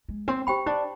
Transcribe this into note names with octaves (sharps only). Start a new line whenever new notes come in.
G#3
C4
C4 G4 C5 G5 B5
D4